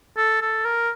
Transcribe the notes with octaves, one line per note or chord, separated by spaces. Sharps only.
A4
A4
A#4